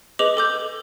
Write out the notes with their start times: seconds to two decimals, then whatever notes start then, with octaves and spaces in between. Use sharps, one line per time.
0.19 G#4 B4 D#5 D6 F7 F#7
0.37 A4 D6 G6